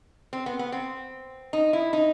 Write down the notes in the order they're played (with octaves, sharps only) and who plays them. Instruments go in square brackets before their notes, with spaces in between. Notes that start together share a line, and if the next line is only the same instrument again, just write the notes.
[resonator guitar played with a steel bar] C4
B3
B3
C4
D#4
E4
D#4